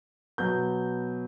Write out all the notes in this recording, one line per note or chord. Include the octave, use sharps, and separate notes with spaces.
B2 F#3 B3 G6